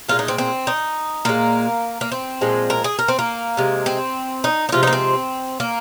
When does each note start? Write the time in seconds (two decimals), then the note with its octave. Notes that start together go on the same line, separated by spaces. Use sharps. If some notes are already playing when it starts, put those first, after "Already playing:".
0.09 A#2 G#3 F4
0.19 D#4
0.28 C4
0.38 C4
0.67 D#4
1.25 A#2 G#3 A#3
2.01 A#3
2.12 C4
2.41 A#2 F3 G#3
2.70 A#4
2.84 G#4
2.99 A#4
3.08 C4
3.19 A#3
3.57 C3 G#3
3.86 C4
4.44 D#4
4.69 D#4
4.72 C3 F3 G#3 F4
4.83 A#3 D#4
4.93 C4
5.60 A#3